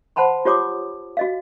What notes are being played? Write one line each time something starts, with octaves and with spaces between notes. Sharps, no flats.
C5 F#5 A5 B5 C6
F4 G4 C#5 D6 D#6
F#4 D#5 F5